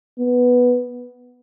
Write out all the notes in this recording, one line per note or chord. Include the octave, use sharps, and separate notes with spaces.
B3